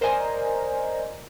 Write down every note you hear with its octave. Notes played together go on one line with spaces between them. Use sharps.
A#4 C5 D5 D#5 G#5 A#5